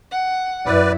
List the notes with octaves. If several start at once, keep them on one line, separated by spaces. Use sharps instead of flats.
F#5
F#2 E4 B4 D5